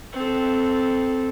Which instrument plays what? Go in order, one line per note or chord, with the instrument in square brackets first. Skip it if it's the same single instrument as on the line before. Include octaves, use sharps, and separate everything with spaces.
[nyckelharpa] C4 A4